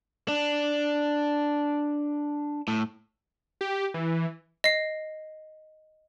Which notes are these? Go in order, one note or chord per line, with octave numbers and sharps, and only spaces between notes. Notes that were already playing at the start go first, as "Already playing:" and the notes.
D4
A2
G4
E3
D#5 C7